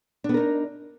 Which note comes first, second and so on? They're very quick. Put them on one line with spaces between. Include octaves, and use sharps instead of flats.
D4 B3 A#4 D#4